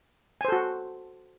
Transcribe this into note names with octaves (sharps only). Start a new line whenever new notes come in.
F#4 A4 C5 G#5